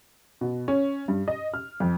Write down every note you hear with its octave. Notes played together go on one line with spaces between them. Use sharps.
B2
C#4
G2
D#5
F6
F2